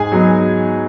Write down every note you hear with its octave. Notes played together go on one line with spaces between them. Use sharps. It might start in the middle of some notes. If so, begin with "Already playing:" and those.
Already playing: G#2 G#4 G#5
F#3 B3 D#4